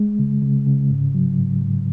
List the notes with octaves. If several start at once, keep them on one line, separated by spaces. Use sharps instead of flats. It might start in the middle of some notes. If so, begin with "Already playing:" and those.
Already playing: G#3
C#3
C#3
C#3
G#2
F#3
G#2
G#2